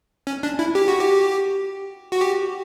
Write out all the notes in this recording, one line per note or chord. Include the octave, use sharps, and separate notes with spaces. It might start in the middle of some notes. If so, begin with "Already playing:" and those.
C#4
D4
E4
G4
F#4
G4
F#4
G4